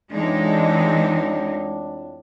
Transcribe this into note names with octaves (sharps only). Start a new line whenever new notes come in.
F2 A2 E3 G#3 D4 D#4